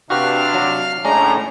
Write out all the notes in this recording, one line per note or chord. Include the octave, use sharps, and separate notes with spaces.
C3 D4 F#4 G4 B4 F5 F6
F#3
A2 G#3 C#4 D4 A#5